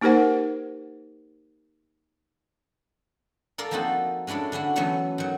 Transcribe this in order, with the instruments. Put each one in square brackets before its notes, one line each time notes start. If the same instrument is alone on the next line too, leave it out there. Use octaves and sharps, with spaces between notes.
[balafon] A#3 D#4 G4 A#4 C5 F#5
[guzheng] A4 A#4 D5 F5 A5
F3 A#3 C4 D#4 F#4 A4
G#3 C#4 D4 E4 A4
D3 C#4 E4 F#4
E3 F#3 A3 B3 C#4
D#3 F#3